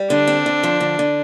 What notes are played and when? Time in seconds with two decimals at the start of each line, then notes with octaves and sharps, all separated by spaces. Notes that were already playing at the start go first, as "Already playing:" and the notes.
Already playing: G3
0.10 D3 D4
0.27 C4
0.46 D3
0.63 F3
0.80 D3
0.99 D3